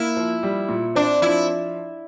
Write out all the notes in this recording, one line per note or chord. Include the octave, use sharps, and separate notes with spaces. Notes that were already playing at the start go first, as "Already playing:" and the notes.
Already playing: A#3 E4
F3
G3
A#2
C4 D4
F3 E4